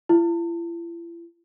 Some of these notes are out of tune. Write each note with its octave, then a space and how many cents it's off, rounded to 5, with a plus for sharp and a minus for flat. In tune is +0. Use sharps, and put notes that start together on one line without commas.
E4 +45